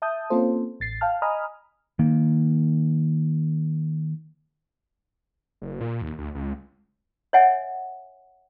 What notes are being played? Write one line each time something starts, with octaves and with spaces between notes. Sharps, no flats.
E5 A5 D#6 G6
A#3 C4 C#4 F4 A4 C5
A1 A6 C7
F5 G5 A5 F6
D#5 G#5 A#5 B5 D#6 F6
D#3 A#3
F#1
A#2
D#2
D2
C#2
C#5 D#5 E5 F#5 G#5